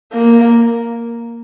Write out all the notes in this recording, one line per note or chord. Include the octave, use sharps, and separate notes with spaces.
A#3